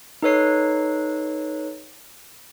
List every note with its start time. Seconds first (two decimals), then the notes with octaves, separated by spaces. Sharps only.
0.22 D#4 A4 B4 C#5 C7